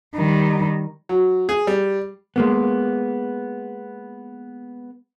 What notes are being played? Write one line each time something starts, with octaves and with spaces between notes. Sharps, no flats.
D#3 G3
F#3
G#4
G3
G#3 A#3 B3